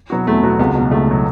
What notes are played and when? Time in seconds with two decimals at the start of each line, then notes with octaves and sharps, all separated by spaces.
0.10 B2 F#3 B3 F#4
0.26 E2 A3
0.43 B2 F#3 B3 F#4
0.59 C#2 B3
0.75 B2 F#3
0.91 C#2 A3
1.07 B2 F#3